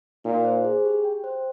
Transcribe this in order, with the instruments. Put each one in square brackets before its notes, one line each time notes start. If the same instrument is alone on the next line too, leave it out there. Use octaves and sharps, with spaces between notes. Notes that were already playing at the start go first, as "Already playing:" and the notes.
[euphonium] A#2 [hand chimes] D#4
[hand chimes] C5
G#4
G4
G5
C5